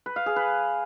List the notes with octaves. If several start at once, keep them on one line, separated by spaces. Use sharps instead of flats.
B4
F5
G#4
B4